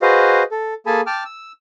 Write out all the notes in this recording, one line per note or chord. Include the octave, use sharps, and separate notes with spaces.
F#4 G#4 B4 C5 D#5 F5
A4
A#3 G#4 A4 G#5 A5 B5
G5 A5 D6 F6
E6